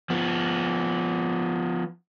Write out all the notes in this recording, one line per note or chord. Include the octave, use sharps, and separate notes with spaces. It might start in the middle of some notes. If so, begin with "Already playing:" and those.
F3 B3